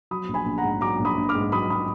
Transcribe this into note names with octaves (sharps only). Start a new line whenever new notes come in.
F#3 B5 D#6
A#1
G#5 B5
A#1
F#5 A#5
G#2
F#3 A#5 D6
A#1
B5 D#6
A#1
D6 F6
G#2
F#3 B5 D#6
B5 D#6